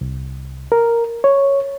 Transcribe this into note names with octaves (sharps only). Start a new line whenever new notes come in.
C2
A#4
C#5